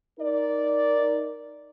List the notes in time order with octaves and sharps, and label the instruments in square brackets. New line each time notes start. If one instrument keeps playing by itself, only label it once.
[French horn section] D#4 A#4 D5